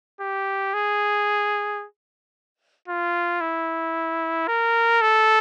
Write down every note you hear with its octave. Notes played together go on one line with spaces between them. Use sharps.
G4
G#4
F4
E4
A#4
A4